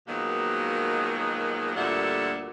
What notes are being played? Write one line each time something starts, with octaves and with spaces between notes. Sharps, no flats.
B2 D#3 F3 F#3 G#3 A#3
D2 A#2 G3 A4 E5 F#5